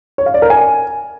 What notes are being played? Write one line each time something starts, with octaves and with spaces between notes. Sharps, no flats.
C#5
F5
D5
A#4
G#5